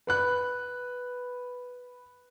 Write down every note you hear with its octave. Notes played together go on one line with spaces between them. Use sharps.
B4 B5 F#6